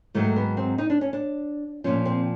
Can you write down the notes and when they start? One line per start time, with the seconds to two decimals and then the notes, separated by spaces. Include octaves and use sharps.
0.15 G#2 D#3 F#3 A3
0.36 B3
0.57 C4
0.78 D#4
0.90 D4
1.01 C#4
1.13 D4
1.84 A#2 F3 C#4
2.05 C4